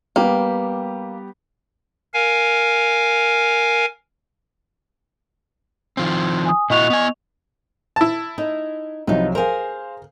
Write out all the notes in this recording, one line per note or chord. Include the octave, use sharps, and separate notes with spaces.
G3 A#3 B3 G4
A#4 F5 G#5
D#3 F3 C4
G#5 D#6
A#2 E4 F#4 D#5 C#6 F7
B3 G#5
E4 A5
D#4
C2 F3 F#3 B3 D#4
G#4 A#4 C5 F5